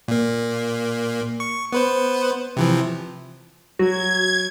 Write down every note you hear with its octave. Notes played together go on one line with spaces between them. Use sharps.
A#2 A#3
C#6
B3 B4 C5
C3 E3 F3
F#3 F#4 G#6